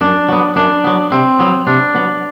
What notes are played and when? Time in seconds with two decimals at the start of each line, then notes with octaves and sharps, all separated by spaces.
0.01 F#2 D4
0.29 F#3 B3
0.56 F#2 D4
0.84 F#3 B3
1.11 C3 C4
1.39 F#3 B3
1.67 C3 D4
1.95 F#3 B3